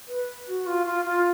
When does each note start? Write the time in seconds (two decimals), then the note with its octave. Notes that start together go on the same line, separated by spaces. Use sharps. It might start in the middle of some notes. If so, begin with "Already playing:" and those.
0.08 B4
0.48 F#4
0.66 F4
0.86 F4
1.05 F4